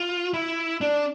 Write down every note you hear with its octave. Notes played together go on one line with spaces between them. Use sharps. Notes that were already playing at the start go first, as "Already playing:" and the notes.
Already playing: F4
E4
D4